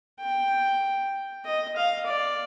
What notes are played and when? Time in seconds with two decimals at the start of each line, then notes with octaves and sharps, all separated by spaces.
0.21 G5
1.46 D#5
1.76 F5
2.06 D5